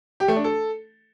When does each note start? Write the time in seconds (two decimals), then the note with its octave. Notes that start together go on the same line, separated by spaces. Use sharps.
0.20 G4
0.28 A3
0.36 D4
0.44 A4